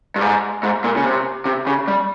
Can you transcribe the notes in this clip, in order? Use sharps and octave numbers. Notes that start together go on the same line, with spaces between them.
G2
G#2
G#2
A#2
C#3
C3
C3
C#3
G3